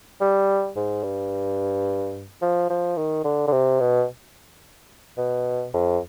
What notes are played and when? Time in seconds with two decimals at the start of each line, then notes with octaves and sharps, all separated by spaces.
0.21 G3
0.76 G#2
1.03 G2
2.41 F3
2.70 F3
2.97 D#3
3.24 D3
3.48 D3
3.52 C3
3.80 B2
5.18 B2
5.74 F2